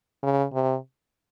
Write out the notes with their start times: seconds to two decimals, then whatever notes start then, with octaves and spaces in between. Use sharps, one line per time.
0.23 C#3
0.54 C3